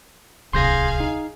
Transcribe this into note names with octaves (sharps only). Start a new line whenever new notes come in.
D1 C2 G#4 F5 C6 G6 A#6
D#4